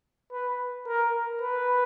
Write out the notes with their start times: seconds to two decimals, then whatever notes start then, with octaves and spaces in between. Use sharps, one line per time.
0.32 B4
0.87 A#4
1.42 B4